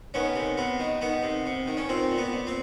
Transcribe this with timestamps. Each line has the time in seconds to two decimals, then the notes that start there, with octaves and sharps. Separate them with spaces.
0.14 D#3 B3 C#4
0.36 C3
0.58 C3 B3
0.79 D#3
1.01 D#3 B3
1.23 C3
1.46 C3
1.68 D#3
1.77 C#4
1.89 A#2 C4
2.11 A#2
2.18 B3
2.32 A#2
2.47 C4